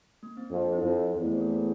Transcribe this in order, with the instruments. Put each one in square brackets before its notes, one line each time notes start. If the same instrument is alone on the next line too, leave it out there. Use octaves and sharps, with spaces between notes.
[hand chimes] A#3
C4
[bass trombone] F2 [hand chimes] D4
[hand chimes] E4
[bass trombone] F2 [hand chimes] F4
[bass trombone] E2 [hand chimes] E4
[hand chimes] A3 A4
C4 C5
A#3 A#4
A3 A4